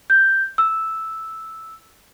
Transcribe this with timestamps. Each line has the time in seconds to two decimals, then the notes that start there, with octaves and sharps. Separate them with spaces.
0.10 G6
0.58 E6